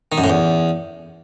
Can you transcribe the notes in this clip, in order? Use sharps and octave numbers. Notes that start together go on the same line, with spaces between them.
D#3
F#2
A2
E2